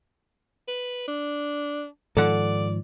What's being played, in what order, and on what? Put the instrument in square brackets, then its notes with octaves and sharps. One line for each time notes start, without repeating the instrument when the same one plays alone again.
[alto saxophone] B4
D4
[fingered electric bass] G#2 D#3 F3 [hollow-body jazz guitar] A4 F#5 [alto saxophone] D5